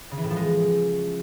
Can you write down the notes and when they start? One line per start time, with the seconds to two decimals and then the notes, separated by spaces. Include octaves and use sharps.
0.11 C#3
0.18 E3
0.24 A2
0.30 F3
0.36 G#3